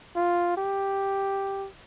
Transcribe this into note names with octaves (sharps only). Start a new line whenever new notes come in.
F4
G4